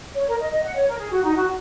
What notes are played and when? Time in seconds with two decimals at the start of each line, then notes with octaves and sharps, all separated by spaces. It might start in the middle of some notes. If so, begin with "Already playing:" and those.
0.15 C#5
0.28 A#4
0.39 D#5
0.51 D#5
0.64 F#5
0.76 C#5
0.87 A#4
0.99 G#4
1.12 F#4
1.23 D#4
1.36 F#4